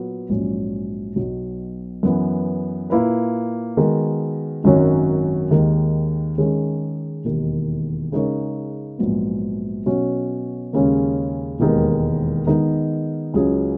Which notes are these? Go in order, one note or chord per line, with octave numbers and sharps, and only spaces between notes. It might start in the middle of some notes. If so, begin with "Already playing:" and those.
Already playing: A#2 F#3 B3 F#4
A#1 G#2 F#3 C#4
B1 B2 F#3
F#2 E3 B3
A#2 A#3 E4 B4
D#3 G#3 B3 F#4 A#4
G#1 F#2 D#3 F#3 C#4
D#2 D#3 G#3
D#3 G#3 C#4 G#4
E1 D#2 D#3
C#3 G#3 D#4 A#4 C#5
A#1 G#2 F#3 B3
B2 F#3 C#4 F#4
D#2 C#3 G#3 C#4
E1 D#2 D#3 G#3 B3
D#3 G#3 B3 D#4 A#4
C#2 C#3 F#3 C#4 G#4